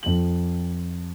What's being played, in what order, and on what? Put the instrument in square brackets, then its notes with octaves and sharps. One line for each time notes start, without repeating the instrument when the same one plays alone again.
[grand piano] F2 F#7